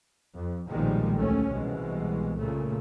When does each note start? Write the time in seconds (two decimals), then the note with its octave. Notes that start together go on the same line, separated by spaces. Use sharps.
0.36 F2
0.70 B1 A#2 D#3 F3 G3 G#3
1.20 D2 A3 C#4
1.50 C2 B2 E3 G#3
2.39 A#2 C#3 A3